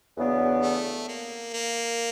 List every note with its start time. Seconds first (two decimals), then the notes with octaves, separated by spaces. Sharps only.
0.17 E2 C#3 F#3 B3 D4
0.62 A3
1.08 A#3
1.53 A#3